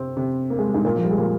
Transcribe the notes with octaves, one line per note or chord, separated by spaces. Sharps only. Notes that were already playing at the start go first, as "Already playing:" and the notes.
Already playing: C3 C4
C3 C4
A#3
G#3
G3
G#2 G#3
A#2 A#3
F3
G3
G#3
A#2 A#3